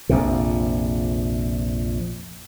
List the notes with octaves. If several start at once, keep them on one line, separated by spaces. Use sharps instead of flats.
A#1 F2 C3